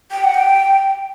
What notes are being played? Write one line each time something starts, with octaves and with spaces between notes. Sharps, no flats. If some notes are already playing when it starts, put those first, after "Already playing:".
G5
F#5
G5